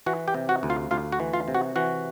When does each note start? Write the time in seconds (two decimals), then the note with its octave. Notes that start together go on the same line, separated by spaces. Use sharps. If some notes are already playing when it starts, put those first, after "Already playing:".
0.06 E3 F#4 F#5
0.28 G4 G5
0.34 C3
0.49 F#4 F#5
0.63 D2
0.70 F4 F5
0.91 D2 F4 F5
1.12 F#4 F#5
1.20 E3
1.33 F4 F5
1.48 C3
1.54 F#4 F#5
1.76 E3 F#4 F#5